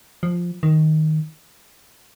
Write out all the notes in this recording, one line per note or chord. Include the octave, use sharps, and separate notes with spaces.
F3
D#3